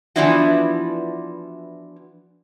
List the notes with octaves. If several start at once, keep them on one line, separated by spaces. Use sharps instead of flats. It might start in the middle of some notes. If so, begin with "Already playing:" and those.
E3 F3 B3 D4 E4 F#4